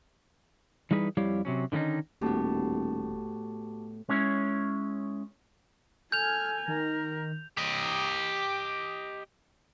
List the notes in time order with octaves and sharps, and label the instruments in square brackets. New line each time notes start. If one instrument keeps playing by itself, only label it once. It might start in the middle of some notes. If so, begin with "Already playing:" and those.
[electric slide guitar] E3 G3 D#4 G#4 B4
F2 G3 E4 G4 C#5 F5
C3 F#3 C#4
D3 D#3 A3 C#4 D#4
[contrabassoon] D#1 [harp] A2 B3 [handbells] F#4 G4 A5
[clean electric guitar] G#3 C#4 E4 C#5
[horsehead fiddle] A4 G#5 [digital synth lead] F6 [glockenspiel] G6 F7
[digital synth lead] D#3 [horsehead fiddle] A#4
[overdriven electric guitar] G4 D#5